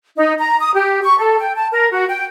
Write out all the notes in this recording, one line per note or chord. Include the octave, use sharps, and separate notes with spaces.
D#4
A#5
D#6
G4
C#6
A4
G5
A5
A#4
F#4
G5